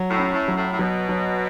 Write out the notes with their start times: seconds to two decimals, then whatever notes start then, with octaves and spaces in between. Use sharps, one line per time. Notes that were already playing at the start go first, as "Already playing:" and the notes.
Already playing: F#3
0.10 A2
0.18 C#4
0.33 A2
0.48 F#3
0.57 A2
0.71 A2
0.79 B2 F#3
1.09 F#3